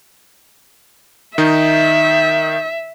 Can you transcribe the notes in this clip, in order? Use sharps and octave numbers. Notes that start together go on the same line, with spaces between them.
D#3 D#4 E5